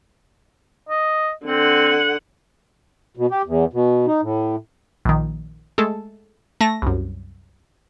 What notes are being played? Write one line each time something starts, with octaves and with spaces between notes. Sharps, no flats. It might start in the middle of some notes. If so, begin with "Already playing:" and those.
D#5
D3 C4 F#5
B2
G4
E2
B2
D#4
A2
A#1 D#3
G#3 A3 A4
A3 A5 A#6
C2 F#2